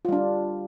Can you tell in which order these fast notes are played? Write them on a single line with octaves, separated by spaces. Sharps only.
F4 G3 D4